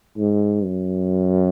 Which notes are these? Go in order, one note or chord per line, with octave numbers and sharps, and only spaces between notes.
G#2
F#2